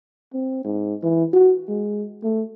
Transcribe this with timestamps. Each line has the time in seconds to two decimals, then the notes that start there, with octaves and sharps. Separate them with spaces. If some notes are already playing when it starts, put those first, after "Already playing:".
0.34 C4
0.65 G#2
1.03 E3
1.33 F#4
1.69 G#3
2.23 A3